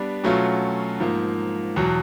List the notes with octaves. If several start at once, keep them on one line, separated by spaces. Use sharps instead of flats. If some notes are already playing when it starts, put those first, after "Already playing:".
Already playing: G3 B3 D4
B2 F#3 A3 C#4 F4
G#2 F3 A#3
E2 B2 F#3